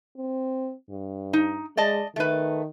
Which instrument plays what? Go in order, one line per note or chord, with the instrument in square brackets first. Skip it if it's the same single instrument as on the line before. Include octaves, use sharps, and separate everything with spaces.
[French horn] C4
G2
[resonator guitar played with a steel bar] D#4
[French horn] G#3 [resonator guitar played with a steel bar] D5 D#5 A5
[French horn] D#3 [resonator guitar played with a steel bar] A3 B4